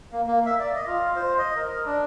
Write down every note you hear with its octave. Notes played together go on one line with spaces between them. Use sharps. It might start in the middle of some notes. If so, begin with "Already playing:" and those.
A#3
A#3
E5
D5
D#5
F4
C5
D#5
A#4
D4